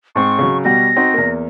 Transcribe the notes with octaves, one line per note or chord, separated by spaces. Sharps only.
G#2 C4 C#6
C#3 F#3
B2 G3 F#4 A#6
C4 D#4 F#4
E2 A#3